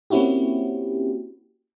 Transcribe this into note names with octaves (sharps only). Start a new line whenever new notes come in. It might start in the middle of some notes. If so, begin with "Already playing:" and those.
A#3 C4 C#4 E4 F#4 G4